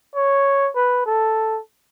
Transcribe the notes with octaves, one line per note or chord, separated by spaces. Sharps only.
C#5
B4
A4